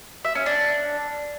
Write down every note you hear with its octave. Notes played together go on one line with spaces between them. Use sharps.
E5
C#4
D4